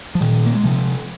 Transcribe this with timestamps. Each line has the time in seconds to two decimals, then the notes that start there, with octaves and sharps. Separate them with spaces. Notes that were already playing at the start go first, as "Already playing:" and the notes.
0.15 F3
0.21 A#2 D#3
0.46 A#3
0.55 G#3
0.64 C3 F3